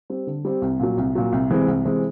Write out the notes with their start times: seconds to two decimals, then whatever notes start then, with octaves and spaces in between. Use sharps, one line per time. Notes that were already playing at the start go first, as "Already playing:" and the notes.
0.10 G3 C4
0.27 D3
0.45 G3 C4
0.62 C2
0.80 A#2 F#3
0.98 C2
1.15 A#2 F#3
1.32 C2
1.50 C3 E3 G#3 C4
1.68 C2
1.85 C3 E3 G#3 C4